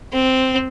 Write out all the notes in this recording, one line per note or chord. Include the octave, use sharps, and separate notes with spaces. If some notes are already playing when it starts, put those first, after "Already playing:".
C4